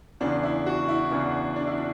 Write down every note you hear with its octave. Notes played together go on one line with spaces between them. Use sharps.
E2 C#3 E3 D4
E4
F#4
E4
E2 C#3 E3 D4
D4
E4
D4